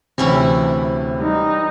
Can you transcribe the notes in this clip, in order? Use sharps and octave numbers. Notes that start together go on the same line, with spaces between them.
D2 C3 E3 C#4 E4
G3 D#4